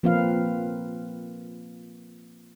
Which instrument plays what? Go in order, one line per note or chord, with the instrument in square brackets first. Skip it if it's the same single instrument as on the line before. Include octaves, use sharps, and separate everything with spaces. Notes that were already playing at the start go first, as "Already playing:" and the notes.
[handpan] F3 A#3 C4 F4 B4 F5